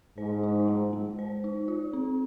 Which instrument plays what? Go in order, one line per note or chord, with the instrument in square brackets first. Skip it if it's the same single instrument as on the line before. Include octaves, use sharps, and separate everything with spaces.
[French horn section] G#2 [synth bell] C5
[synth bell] D#4
G#3
G#3
C5
D#4
F4
C4